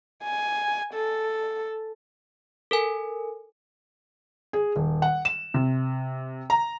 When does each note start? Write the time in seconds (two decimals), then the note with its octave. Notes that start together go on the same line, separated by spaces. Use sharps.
0.23 G#5
0.93 A4
2.71 A4 A#4 G#5
4.53 G#4
4.76 D#1
5.02 F#5
5.25 E7
5.54 C3
6.50 A#5